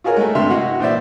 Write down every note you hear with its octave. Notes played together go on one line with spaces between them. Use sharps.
F4 F#4 G#4 A#4 C#5
G#3 A3
G2 C3 E5 C6
E4 F#4 D#5 F#5
A#1 E3 C5 D5 E5